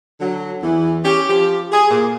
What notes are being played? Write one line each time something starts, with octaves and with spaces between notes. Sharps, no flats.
D3 F#3
E2 E3
C#4 G4
F3 G4
G#4
A#2